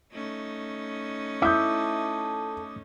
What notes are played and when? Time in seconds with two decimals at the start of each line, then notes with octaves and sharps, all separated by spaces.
0.13 A3 C#4 D#4
1.42 E4 A4 E5 D6 D#6 G6